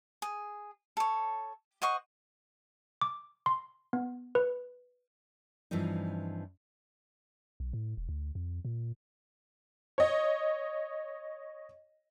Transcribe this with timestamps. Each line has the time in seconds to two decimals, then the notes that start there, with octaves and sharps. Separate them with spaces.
0.22 G#4
0.97 A4 C#5
1.82 C5 D#5 F#5 C#6
3.02 D6
3.46 C6
3.93 B3
4.35 B4
5.71 G2 E3 F3 C4 D#4
7.60 B1
7.73 A2
7.97 E1
8.09 D2
8.35 F2
8.65 A#2
9.98 C#5 D#5